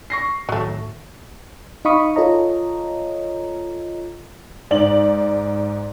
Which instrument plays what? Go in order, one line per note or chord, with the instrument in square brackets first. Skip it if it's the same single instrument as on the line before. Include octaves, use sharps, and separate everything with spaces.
[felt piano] C#6 A#6 C7
[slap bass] A2 D#3 [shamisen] F#3 A3
[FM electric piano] D#4 D#5 F5 B5 C#6 D#6
F4 A4 C#5 D#5 A#5
[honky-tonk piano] G#2 D5 F#7